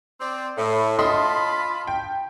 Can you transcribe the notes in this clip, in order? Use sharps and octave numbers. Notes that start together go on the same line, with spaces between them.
C4 D5
A2
F4 D#5 A5 B5 C6 D#6
G5